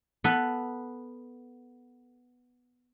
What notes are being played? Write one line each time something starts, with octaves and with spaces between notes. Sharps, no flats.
B3 A4 B4